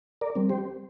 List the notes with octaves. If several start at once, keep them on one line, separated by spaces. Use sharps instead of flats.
A#4 D5
G3 C4
G4 C5